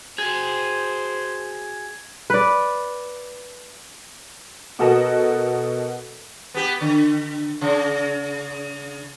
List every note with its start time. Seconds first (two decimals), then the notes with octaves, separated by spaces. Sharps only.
0.18 F#4 G#4 C5 G#6
2.30 B4 D5
4.79 B2 F#4 A4 A#4 D#5 E7
6.54 B3 G4
6.81 D3
7.61 C#3